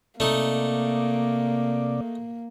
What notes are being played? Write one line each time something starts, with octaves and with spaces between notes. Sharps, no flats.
C3 A3 A#3 D#4 D5